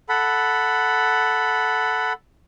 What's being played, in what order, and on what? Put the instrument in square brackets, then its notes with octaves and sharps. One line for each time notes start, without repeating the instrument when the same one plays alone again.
[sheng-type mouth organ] A4 F#5 B5